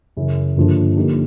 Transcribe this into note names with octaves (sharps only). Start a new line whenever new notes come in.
F#2 C#3 E3
G2 D3 F3 A#3 D4
D3 F3 A#3 D#4 G4